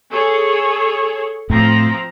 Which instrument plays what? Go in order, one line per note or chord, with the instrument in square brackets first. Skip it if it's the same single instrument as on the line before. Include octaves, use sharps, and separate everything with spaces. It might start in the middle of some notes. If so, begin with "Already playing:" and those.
[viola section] G#4 A4 C#5
[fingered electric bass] A2 [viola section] F3 C4 A#5